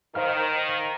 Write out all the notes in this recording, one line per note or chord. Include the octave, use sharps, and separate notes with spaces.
D#3 C5 F5 F6